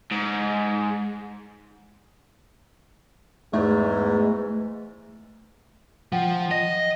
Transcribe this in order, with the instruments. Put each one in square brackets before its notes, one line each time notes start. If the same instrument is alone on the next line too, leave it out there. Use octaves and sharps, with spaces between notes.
[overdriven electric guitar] G#2
[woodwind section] E2 G#2 [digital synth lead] A3
[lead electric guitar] F3 [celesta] F#5 G5
[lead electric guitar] D#5 [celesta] A#6